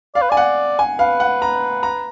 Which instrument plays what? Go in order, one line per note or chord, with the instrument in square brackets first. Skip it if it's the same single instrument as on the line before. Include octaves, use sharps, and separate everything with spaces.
[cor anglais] D5 [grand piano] F5
[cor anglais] B4
[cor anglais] D5 [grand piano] G#5
[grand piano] F#5
G#5
[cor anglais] B4 [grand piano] F5
[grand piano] F#5
A#5
A#5